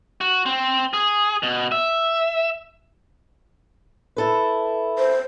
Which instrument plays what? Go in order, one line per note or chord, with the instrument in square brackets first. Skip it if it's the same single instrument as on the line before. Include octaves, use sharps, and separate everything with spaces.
[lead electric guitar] F#4
C4
G#4
B2
E5
[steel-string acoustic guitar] E4 A4 B4
[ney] C5